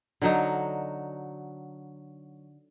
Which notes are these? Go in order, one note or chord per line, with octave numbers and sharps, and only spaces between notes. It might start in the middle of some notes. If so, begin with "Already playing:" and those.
D3 F#3 D#4